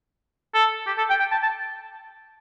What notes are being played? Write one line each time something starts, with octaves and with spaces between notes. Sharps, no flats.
A4
G4
A4
G5
G5
A5
A5